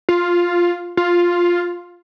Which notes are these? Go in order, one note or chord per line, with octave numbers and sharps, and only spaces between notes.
F4
F4